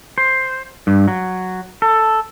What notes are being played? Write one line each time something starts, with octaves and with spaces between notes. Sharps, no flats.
C5
G2
F#3
A4